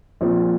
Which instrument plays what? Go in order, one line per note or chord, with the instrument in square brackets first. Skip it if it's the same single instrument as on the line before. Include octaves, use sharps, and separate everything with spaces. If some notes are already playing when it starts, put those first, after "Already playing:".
[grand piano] A#1 A#2 F3 C4